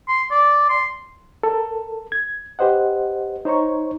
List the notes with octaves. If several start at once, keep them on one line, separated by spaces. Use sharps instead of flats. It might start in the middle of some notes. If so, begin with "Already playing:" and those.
C6
D5
C6
A4 A#4
G#6
G4 B4 C5 D#5 F#5
D#4 C5 C#5 A#5 C#6